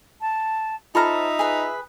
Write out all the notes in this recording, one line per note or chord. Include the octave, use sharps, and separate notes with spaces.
A5
D#4 F4 A4 C5 E5 A#5 B5 F6
G#4 B4